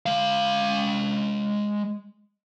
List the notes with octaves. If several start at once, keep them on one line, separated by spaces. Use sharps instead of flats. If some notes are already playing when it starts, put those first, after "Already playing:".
G#3 F5